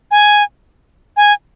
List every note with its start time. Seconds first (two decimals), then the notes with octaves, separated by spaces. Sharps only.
0.11 G#5
1.17 G#5